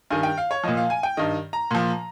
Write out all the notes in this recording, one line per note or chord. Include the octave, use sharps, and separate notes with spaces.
G2 D#3 G#5
G5
F5
C#5
A#2 F3 D#5
F5
G#5
G5
G2 D#3 D#5
A#5
A#2 F3